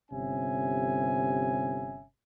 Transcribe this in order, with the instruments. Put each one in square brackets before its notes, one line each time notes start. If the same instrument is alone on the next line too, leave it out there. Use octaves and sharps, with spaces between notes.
[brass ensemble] G1 C3 C#4 E5 G#5